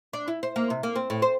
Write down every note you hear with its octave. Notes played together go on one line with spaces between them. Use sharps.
D4
E4
C5
A#3
C3
A#3
C4
A2
C5